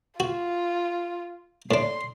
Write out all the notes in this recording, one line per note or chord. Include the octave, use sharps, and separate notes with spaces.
F4 F#4
A2 D4 C6